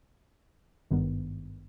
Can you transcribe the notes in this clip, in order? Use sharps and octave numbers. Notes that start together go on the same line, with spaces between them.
G#1 G2 D#3 B3